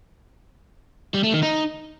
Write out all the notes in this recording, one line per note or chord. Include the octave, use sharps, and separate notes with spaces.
G3
A3
D#3
D#4